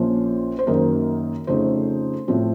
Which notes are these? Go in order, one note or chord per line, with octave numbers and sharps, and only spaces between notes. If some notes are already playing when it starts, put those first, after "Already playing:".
Already playing: A#1 A#2 F3 A#3 C#4 C5
C5
F#2 D#3 A#3 D#4 A#4
F2 C#3 A3 D#4 C5
A2 F3 C4